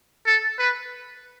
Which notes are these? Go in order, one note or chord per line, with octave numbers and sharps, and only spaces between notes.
A4
B4